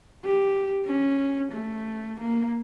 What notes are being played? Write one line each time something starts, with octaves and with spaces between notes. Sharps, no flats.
G4
C#4
A3
A#3